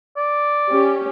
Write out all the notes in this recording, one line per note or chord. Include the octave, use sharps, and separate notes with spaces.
D5
C#4 G4